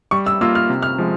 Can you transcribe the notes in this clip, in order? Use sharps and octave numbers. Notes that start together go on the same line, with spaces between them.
G3 C#6
E6
A#3 F4 A#4 E6
F6
C3
F6
F3 G#3